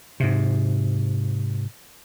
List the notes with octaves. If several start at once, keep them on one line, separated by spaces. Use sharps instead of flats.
G#2 C3